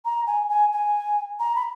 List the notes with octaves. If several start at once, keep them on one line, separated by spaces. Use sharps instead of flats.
A#5
G#5
G#5
G#5
A#5
B5